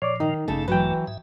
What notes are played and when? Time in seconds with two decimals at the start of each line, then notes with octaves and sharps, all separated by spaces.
0.02 A#2 F3 C#5 D5 D6
0.20 D#3 D#4
0.48 A1 G2 C#3 A3 A4
0.68 E3 F#3 B4 G5
1.07 G#2 E5